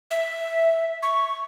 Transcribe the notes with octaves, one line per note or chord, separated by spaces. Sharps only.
E5
C#6